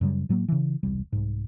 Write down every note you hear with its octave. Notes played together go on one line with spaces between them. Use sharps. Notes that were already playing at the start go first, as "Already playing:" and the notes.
F#2 C#3 G3
A2 F#3 G#3 A#3
C#3 E3
E1 C2 G3
C2 G#2